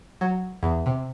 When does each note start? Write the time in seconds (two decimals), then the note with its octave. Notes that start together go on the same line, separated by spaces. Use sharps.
0.21 F#3
0.63 E2
0.86 C3